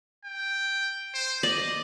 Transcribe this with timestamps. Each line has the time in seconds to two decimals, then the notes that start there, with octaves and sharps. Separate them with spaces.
0.25 G5
1.14 C5
1.43 D5 D#5